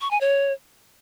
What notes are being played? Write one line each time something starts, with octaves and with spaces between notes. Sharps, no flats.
C#6
G#5
C#5